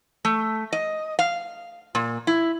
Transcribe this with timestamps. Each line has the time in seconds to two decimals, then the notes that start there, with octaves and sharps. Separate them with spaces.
0.25 A3
0.73 D#5
1.19 F5
1.95 A#2
2.27 E4